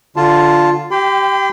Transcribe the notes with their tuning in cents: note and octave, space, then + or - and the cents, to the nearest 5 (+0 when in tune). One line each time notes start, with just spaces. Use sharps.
D3 +0 F4 +0 A5 +0
G4 -15 G5 +10 C6 -45